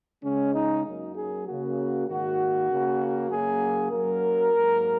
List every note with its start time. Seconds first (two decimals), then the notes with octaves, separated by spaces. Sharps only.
0.24 C#3 G#3 C#4
0.55 D#4
0.85 F#2 F#3 A#3 D#4
1.16 G#4
1.47 C#3 A#3 F#4
2.07 G#2 D#3 A#3 F#4
2.69 C#3 A#3
3.30 F#2 C#3 F#3 A#3 G#4
3.92 F#2 F#3 A#3 A#4
4.52 G#2 F#3 A#3